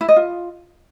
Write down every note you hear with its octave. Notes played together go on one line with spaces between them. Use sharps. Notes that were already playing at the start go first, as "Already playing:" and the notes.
E4
D#5
F4